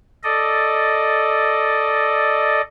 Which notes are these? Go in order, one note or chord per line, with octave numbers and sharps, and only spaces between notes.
A4 D5 D#5